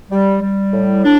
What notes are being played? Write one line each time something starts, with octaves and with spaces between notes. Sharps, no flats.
G3
G3
A2
D4